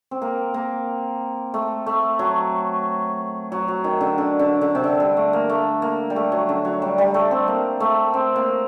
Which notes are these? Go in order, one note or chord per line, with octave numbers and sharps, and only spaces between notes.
C4
A#3
A#3
A3
A3
F#3
F#3
F#3
D#3
D3
D3
D3
D3
C3
D3
G3
A3
A#3
A3
A#3
G3
A3
F#3
D3
F#3
G3
G3
A3
C4
A#3
A3
C4
A#3